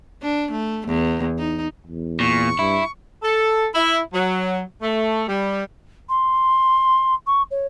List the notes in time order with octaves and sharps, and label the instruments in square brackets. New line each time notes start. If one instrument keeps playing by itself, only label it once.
[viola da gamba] D4
A3
E2
D#4
[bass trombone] E2
[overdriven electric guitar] A#2 [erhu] C#6
[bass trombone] G2 [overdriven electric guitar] E4
[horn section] A4
E4
F#3
A3
G3
[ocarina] C6
C#6
C#5